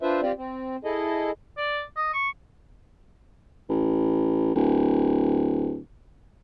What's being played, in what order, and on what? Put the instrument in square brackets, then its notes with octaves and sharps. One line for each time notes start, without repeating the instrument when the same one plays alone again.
[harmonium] D4 F4 B4 C5 E5
C4 F4 G4 D5
C4
E4 G#4 A4 D#5
[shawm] D5
D#5
C#6
[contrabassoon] A1
D1